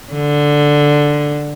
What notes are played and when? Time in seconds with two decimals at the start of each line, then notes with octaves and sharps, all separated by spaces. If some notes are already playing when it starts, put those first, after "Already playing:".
0.13 D3